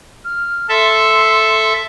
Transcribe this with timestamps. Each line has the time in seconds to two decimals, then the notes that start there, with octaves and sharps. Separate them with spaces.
0.24 F6
0.69 A4 E5 C6